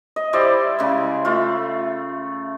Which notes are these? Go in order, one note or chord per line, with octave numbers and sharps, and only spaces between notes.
D#5
G3 E4 C5 D5
C#3 G#3
A3 F4